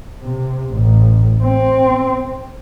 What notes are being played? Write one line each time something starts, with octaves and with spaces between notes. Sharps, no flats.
C3
A1
C4